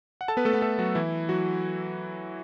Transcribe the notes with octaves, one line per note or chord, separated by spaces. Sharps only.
F#5
A4 A5
B3 B4
A3 A4
B3 B4
A3 A4
F#3 F#4
E3 E4
F#3 F#4